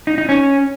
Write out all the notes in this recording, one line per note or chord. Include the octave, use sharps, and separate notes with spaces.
D#4
D#4
C#4